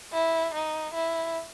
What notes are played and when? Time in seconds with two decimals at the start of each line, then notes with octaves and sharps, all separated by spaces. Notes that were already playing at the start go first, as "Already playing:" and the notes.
0.13 E4
0.54 D#4
0.94 E4